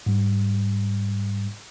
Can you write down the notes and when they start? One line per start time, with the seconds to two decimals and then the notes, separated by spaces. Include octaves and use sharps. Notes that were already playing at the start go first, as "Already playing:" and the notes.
0.06 G#2 G3